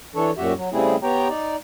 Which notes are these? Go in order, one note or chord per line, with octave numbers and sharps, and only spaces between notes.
E3 D4 A4 C#5
F#2 A#2 F#4 G4 E5
F#3
C#3 G3 A3 C4 E4 G#4
B3 G4 C#5 G5 A#5
D#4 D5